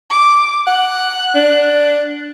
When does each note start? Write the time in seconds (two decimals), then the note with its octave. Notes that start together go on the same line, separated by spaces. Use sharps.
0.10 D6
0.67 F#5 F#6
1.35 D4